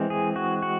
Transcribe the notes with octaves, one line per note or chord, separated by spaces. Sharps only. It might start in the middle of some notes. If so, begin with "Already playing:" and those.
Already playing: E3 G#3 C4
G#4
F#4
F#4